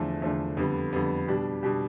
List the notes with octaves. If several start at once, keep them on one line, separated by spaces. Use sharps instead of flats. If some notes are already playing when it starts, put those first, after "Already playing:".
Already playing: E2 D3 F3 A3
E2 D3 F3 A3
F2 D3 G3 B3
F2 D3 G3 B3
B2 G3 D4 G4
B2 G3 D4 G4